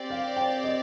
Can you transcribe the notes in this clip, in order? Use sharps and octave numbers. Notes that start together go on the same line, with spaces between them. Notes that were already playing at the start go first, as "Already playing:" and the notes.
Already playing: C4 G4 D5
F5
G5
D#5